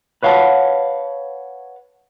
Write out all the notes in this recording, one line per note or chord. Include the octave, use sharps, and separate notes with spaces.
B4 C#5 F5 F#5 A5